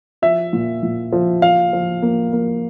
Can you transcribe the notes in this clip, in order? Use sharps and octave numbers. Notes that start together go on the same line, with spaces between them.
F3 E5
A#2
A#2
F3
F3 F5
F3
A#3
A#3